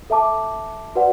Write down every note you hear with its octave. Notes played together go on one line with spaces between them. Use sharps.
A4 E5 A5 D6
F#4 B4 D5 F#5